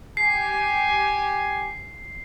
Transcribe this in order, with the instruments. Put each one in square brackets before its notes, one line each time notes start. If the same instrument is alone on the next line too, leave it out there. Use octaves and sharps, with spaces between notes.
[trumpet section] G4 G#5 [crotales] C7